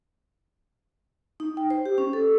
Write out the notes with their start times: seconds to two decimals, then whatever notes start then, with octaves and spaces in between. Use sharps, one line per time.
1.40 D#4
1.57 G5
1.70 C5
1.85 G4
1.98 C#4
2.13 A4